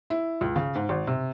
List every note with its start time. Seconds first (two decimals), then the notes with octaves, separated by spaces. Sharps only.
0.10 E4
0.41 C#2
0.56 C#3
0.76 G#2
0.89 G#1
1.07 C3